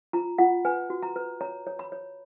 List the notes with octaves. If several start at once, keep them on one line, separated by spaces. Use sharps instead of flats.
F4 A#5
F4 F#5
B4 G#5
F#4
A#5
B4
C#5 A#5
C#5
B5
C#5